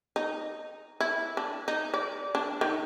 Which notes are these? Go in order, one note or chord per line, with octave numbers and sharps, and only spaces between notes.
D#4
E4
D4
D#4
D5
D4
D#3